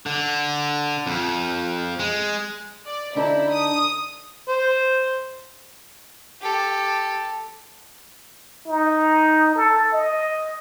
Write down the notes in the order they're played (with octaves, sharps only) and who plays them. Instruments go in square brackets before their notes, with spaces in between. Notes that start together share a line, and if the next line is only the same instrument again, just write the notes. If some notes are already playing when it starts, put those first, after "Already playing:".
[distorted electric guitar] D3
F2
G#3
[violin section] D5
[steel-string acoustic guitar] D3 D#4 A4 [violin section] E4
[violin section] D#6
[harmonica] C5
[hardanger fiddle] G4 A4
[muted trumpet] D#4
A4
D#5